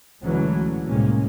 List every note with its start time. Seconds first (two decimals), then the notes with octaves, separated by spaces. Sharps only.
0.23 D2 D3 E3 F#3 G#3 C#4
0.87 C2 A2 C3 G#3 A#3 C#4